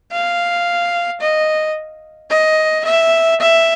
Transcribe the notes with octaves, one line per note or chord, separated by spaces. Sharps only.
F5
D#5
D#5
E5
E5